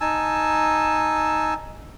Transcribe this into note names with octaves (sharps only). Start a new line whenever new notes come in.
D#4 G#5 A5 E6